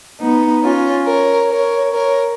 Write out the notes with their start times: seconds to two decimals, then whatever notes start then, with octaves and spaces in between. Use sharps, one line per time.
0.20 B3 D#4
0.63 C#4 F4
1.07 A#4 C#5
1.50 A#4 C#5
1.93 A#4 C#5